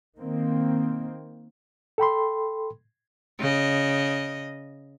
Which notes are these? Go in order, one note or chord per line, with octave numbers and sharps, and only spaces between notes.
D#3 A#3 C4
A4 G5 B5 C6
C#3 D#5